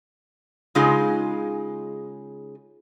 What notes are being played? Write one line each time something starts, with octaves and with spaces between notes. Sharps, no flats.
C#3 G#3 D#4 F4 G#4